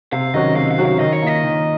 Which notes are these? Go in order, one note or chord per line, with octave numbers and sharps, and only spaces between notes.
C3 F5
D#3 F#3 C#4 F#4 D#5
C3 F5
F5
D#3 F#3 C#4 F#4
F5
D#3 D#5
C#5
A#3 F4 D#5
D#3